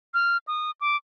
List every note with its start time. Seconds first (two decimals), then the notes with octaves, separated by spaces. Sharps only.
0.14 F6
0.47 D#6
0.81 D6